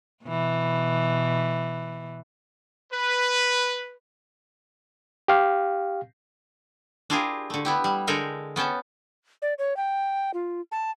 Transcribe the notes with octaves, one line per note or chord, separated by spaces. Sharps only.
B2 E3
B4
G4 F5
D4 E4 F4 G4 G#4 A#4
D3 A3
B3 E4 G4
G3
D3 G#3 A4 A#4 G5 G#5
B3 C#4 G5 A5
D5
C#5
G5
F4
A5